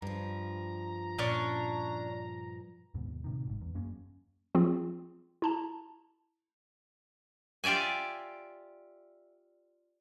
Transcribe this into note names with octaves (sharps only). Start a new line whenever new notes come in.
G2 F3 A#5
A#2 C#4 D4 C#5
D#2 G#2 B2
A2 C3 D#3
G#1 G#2
E2
F#2 A#3 C#4
F3 C4 F4 G#4
E4 A5 A#5
F4 G4 D5 E5 G#5